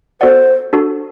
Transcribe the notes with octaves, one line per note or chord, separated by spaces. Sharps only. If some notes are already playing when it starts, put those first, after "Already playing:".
B3 F#4 A4 C5 D5 F#5
D4 F#4 A4